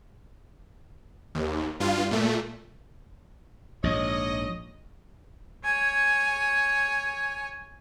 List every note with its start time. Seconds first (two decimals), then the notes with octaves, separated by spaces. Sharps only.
1.35 D#2
1.80 G2 F4
2.11 A#2 A3
3.84 A#1 G#2 C#5 D#5
5.65 C#5 G#5